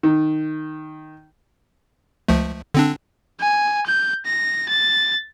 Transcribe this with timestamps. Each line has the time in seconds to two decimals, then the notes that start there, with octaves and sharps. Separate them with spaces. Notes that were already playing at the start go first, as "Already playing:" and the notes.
0.03 D#3
2.28 C#2 F3 A3
2.74 D3 C4 D4
3.40 G#5
3.87 G6
4.26 A#6
4.68 A6